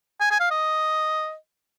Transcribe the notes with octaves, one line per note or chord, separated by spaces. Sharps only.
G#5
G#5
F5
D#5